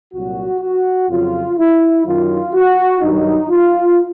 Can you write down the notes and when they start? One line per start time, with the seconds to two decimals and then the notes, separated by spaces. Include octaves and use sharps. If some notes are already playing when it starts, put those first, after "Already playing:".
0.13 C2 A#2 F#3 F#4
0.61 F#4
1.09 F2 C#3 F#3 F4
1.58 E4
2.05 F#2 D#3 F#3 F4
2.53 F#4
3.01 G2 D#3 F#3 D#4
3.49 F4